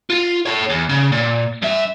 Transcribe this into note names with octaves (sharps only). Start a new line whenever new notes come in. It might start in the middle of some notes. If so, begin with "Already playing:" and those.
F4
A4 C#5
E2
C#3
A#2
G2 E5